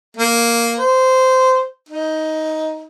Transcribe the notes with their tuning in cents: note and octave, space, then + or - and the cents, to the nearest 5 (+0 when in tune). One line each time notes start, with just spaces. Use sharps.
A#3 +0
C5 -15
D#4 +10